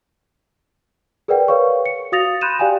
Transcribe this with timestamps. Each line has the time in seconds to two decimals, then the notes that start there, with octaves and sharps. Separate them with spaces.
1.28 G#4 A#4 B4 D5 F#5 G5
1.48 A#4 B4 C#5 F5 C#6
1.86 C#7
2.12 F#4 F5 D#6 A6 A#6 F7
2.41 B5 C6 F#6 G6 D#7 E7
2.59 G4 D5 F5 G5 G#5